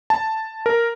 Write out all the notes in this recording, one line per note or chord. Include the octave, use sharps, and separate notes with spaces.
A5
A#4